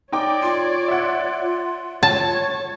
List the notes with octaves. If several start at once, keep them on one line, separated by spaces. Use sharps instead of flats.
D#4 C#5 D5 G5 D6
F4 C6
E5 F#5
C#5 A5